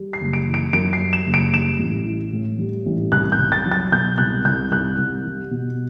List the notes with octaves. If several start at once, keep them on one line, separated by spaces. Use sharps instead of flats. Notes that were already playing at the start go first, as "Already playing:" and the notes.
Already playing: G3
C7
F#1
D7
E3
D7
F#2 D7
C7
G3
E7
F#1
D7
G3 E7
A1
E3
A2
G3
A1
C2 F#6
G6
C2
A6
F#3
A6
B2 G6
C2 F#6
C2 G6
C2 F#6
C2
G3
B2